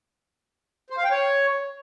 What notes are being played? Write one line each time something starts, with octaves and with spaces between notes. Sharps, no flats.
C5
F5
G5
C#5